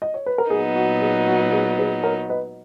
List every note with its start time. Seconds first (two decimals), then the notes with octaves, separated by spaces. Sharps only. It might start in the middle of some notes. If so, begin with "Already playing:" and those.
0.02 D#5
0.14 C#5
0.26 B4
0.38 A#4
0.50 A#2 F#3 B3 D#4 G#4
0.76 F#4
1.01 G#4
1.28 F#4
1.52 G#4
1.79 G#4 B4
2.04 A#4 C#5
2.30 B4 D#5